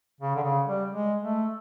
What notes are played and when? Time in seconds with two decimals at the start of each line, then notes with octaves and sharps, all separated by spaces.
0.21 C#3
0.36 D3
0.44 C#3
0.67 G3
0.92 G#3
1.23 A3